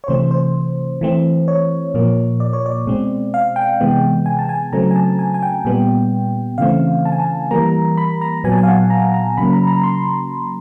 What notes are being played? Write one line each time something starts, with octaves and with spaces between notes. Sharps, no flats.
C#5
C3 E3 A3 C4 C5
C5
E3 A3 C4
C#5
A#2 F3 A#3
D5
C#5
D5
B2 G#3 C4
F5
G5
C3 E3 G#3 B3
G#5
A5
G#5
C#3 F#3 A3 C4 A#5
G#5
A5
G#5
G#5
G5
A#2 G3 B3
C#3 E3 A3 C4 F5
A5
G#5
A5
E3 G3 A#3 A#5
B5
A#5
A#2 F#3 B3 G#5
A5
G#5
F5
F#5
A#5
A#5
C#3 F#3 A#3 B5
A#5
A#5
C6